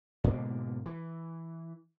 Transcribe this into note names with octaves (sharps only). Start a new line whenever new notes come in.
G#2 B2 D3 A#3
E3